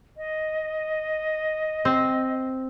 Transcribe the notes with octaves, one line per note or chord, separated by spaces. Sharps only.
D#5
C4